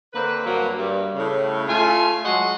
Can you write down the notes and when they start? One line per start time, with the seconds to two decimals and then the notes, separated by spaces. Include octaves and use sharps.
0.13 D3 A#3 C4 B4
0.46 G2 F#3 A#3
0.78 G2
1.14 A2 C#3
1.68 A3 F4 G#5
2.24 F#3 G#3 F#4 D#5 F#5 C6